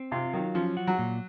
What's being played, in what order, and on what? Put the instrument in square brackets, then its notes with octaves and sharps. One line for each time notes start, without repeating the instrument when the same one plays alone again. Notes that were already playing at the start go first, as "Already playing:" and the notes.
Already playing: [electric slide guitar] C4
[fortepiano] C3 [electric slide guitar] F4
[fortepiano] D#3 [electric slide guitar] F#3
[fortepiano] F3 [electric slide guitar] C#4
[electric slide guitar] F#4
[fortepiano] F#3
[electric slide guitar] A#2